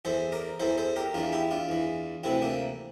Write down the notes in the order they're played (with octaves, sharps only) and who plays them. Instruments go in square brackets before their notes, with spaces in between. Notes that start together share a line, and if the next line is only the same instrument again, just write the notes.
[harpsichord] E2 E3 A4 C5
A#4 D5
E2 E3 A4 C5
A4 C5
G4 A#4
E2 E3 D4 F4
E4 G4
D4 F4
E2 E3
D2 C3 E3 C4 E4
A#3 D4